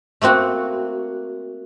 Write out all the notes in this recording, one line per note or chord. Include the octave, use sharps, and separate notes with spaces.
A3 A#3 C4 F#4